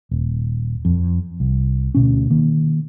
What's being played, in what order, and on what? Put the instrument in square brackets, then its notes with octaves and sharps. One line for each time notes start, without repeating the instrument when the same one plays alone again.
[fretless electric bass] D#1
F2
C2
D2 B2 C#4
D#3 A#3